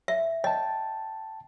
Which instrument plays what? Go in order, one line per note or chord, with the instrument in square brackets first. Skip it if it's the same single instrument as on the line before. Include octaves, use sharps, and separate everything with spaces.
[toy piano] E5
[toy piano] D#5 [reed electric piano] G5 A5